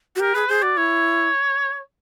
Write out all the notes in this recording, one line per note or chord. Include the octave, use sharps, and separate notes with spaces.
F#4
G4 A#4
G#4 B4
G#4 C5
F#4 D5
E4 C#5